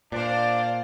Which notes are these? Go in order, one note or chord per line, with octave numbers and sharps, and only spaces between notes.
A#2 D4 C5 D5 F5